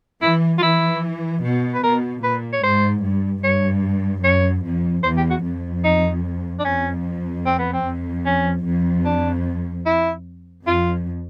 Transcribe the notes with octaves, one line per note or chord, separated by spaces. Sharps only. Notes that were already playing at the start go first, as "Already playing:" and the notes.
E3 E4
F4
E3 E4
B2
B4
B2 A#4
A#2 B4
C#5
G#2 C5
G2
G2 C#5
F#2 C#5
F2
E2 C5
G4
F#4
F2
D#4
D4
F2 C#4
C4
B3
C4
F2
C#4
F2
D4
E4
F2 F4